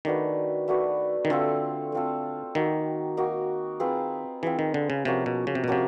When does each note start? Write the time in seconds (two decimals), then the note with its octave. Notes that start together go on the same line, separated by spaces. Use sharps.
0.05 D#3 A3 D4 F#4 B4
0.68 A3 D4 F#4 B4
1.25 D#3
1.30 D3 A3 C4 F4 A4
1.92 A3 C4 F4 A4
2.55 D#3 A#3 D#4 F#4
3.17 A#3 D#4 F#4
3.80 C4 F4 G#4 B4
4.43 E3 C4 F4 G#4 B4
4.59 D#3
4.74 D3
4.90 C#3
5.05 C3 F3 A#3 C#4 F#4
5.26 B2
5.47 C#3
5.55 C3
5.64 B2
5.68 C3 F3 A#3 C#4 F#4